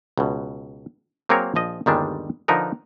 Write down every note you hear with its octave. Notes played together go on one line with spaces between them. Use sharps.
C#2 B2
F#3 A#3 C4 G#4 A#4 C#5
A#1 F3 D#5
G1 D#2 D#3 G3 G#3 D4
D3 F3 D#4 A#4 B4